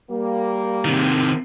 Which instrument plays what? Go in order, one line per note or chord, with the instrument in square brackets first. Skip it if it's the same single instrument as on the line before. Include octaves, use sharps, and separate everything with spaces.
[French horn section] G3 A#3
[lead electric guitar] C3 D#3